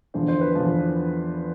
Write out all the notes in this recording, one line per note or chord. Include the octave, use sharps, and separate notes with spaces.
E2 D3 F3 C5
C5
B4
E2 D3 F3